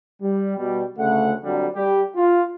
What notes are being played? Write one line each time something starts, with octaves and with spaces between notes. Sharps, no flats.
G3
B2 G3
D2 C#3 A3 F#5
F2 D3 F#3 G3
G3 G4
F4